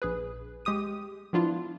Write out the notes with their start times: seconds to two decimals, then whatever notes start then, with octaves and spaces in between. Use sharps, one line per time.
0.02 A#1 G#4 B4
0.65 G#3 G4 D#6 D#7
1.33 F3 B3 D4 E4 F4